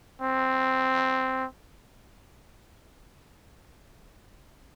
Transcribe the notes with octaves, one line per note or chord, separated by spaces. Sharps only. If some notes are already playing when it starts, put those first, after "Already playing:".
C4